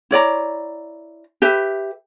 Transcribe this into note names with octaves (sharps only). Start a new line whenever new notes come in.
E4 C#5 D5 A#5
G4 B4 E5